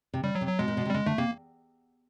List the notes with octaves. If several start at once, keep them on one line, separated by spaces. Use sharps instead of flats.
C3
C#3 G3
F#3
C3
F#3
B2 G#3
A#2
B2
C3
G3
C#3 G#3
D3 A3
C3 A#3